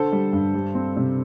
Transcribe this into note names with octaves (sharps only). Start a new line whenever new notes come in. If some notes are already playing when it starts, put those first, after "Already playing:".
Already playing: D3 A4 C5
G3
G2
G3
C4
C3